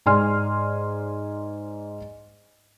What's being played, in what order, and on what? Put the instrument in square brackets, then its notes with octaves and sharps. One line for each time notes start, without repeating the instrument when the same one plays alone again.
[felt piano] G#2 D5 G#5 C6 F6